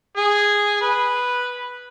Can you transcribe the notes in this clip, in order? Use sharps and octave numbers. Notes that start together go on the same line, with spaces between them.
G#4
B4